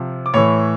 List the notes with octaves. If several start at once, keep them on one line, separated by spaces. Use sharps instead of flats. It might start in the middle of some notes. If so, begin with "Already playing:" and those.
Already playing: C3 F3
D6
A2 E3 C#5 C#6